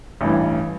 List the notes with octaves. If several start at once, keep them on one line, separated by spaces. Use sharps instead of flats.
A1 G2 E3